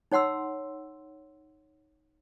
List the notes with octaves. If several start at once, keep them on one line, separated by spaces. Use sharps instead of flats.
D#4 C#5 F#5 C6 E6